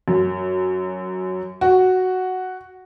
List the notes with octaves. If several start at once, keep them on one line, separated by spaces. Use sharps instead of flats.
F#2
F#4